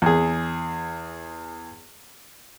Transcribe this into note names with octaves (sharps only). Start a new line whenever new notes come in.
E2 G#4